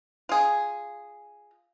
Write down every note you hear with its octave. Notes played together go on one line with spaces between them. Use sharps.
F4 G#4